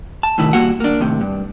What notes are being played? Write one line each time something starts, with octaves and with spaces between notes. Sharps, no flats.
A5
A2 C3 D#3 E4
G2 A#3 F#4 F#5
A#3 D4
D#2 A2 C3
G2